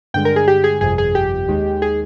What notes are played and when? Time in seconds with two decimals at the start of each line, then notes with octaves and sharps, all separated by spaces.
0.14 G2 D3 G#3 G5
0.25 A#4
0.36 G#4
0.48 G4
0.64 G#4
0.81 G1 F2 C3 G#4
0.98 G#4
1.15 G4
1.48 D#2 D#3 G#3
1.82 G#4